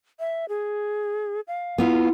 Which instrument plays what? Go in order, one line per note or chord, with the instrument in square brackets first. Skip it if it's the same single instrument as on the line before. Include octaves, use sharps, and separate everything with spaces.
[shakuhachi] E5
G#4
F5
[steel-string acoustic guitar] B3 F4 [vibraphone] E4